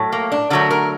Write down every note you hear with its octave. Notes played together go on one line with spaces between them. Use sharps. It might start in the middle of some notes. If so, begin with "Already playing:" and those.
Already playing: A2 F#3 A3
A#3
D4
D3 F#3 A3 A#4
A#4